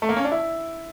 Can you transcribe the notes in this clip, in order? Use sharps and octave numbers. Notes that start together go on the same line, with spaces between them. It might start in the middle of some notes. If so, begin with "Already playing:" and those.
A3
A#3
C#4
D4
E4